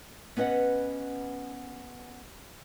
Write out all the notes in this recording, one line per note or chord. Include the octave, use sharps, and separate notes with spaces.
B3 C#4 B4 D#5 F#5